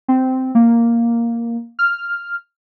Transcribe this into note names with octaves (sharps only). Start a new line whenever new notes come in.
C4
A#3
F6